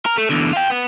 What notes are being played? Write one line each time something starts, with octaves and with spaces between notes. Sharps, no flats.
A#4
A3
E2 D3
F4 G5
B3